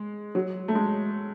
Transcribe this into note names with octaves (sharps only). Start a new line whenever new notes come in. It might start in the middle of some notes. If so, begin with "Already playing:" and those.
Already playing: G#3
F#3
A3
G#3